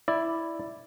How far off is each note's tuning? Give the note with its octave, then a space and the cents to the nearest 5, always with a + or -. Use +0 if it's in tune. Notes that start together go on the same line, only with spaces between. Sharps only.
E4 +0 D5 +0